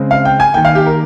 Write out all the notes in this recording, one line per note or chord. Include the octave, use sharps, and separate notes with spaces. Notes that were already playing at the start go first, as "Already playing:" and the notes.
Already playing: C#3 G#3 C4
F5
G5
G#5
D#3 A#3 G5
F5
G4
A#4